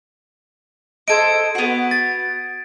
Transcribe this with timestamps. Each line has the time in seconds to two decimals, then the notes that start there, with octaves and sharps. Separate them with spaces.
1.08 D#4 A4 C5 G#6 D7
1.55 B3 F#4
1.91 A6